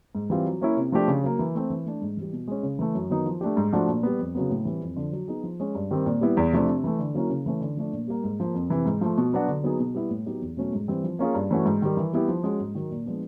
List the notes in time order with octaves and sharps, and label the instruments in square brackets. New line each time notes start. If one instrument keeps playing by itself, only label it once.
[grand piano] G#2
E3 G3 C4 F4
F#3
A#3 C#4 E4
C3
F3 A3 D4 G4
C#3
F#3 A#3
E3
A3 C4
E3
A3 D4
G#2
E3 G3
B2
G#3 C#4
C#3
E3 A3
F#2
D#3 F#3 B3 D#4
F3
A3 D4 G4
G#2
F3 A3 D4 F#4
A#2
G3 B3
F2
C#3 F#3 B3
A2
E3 G3 C4
F2
D3 F3
F#3
B3 D#4 G#4
F3
G#3 C#4
G2
D#3 G3 C4
A#2
G3 B3 E4
E2
C3 F3 A3 D4
C3
E3 A3
D3
F#3 A#3 C#4 E4
C#3
E3 A3 C#4
D3
F3 A3 D4
A#2
G3 A#3
G#2
F3 A#3
F2
C3 E3
G#2
F3 A3
B2
F#3 B3 D4 F#4
D3
F#3 B3 D#4 G#4
B2
G3 B3 E4
A2
F#3 B3 D#4 G4
E2
B2 F#3 A3 C#4
G#2
E3 G3 C4
F3
A#3 C#4 F4 G#4
G2
E3 A3 C#4 F#4
G#2
D#3 G3
E3
G3 B3 E4 G4
F3
G#3 C#4 F#4
G#2
D#3 F#3
A#2
F3 G#3 B3 D4